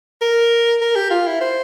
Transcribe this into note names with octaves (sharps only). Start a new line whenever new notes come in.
A#4
A#4
G4
F4
E4
C5